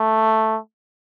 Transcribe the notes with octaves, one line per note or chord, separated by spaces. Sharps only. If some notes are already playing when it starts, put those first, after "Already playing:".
Already playing: A3